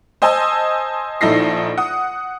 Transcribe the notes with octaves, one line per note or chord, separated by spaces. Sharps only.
C5 D#5 G#5 A5 D#6 E6
A#1 D#4 E4 A4 A#6 C7
F#5 D#6